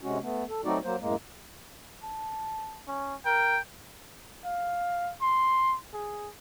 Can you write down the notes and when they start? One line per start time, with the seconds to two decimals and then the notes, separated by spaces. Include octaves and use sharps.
0.01 C3 G#3 C#4 F#4
0.21 A3 B3
0.49 A4
0.65 F#3 A3 C4 D#4 F#4 D5
0.84 F#3 A#3 C5
1.01 F#2 A2 G#3 A#3
2.03 A5
2.87 C#4
3.26 A#4 G5
4.45 F5
5.21 C6
5.93 G#4